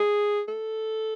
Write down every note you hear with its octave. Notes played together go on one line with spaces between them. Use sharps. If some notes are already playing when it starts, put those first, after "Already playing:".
Already playing: G#4
A4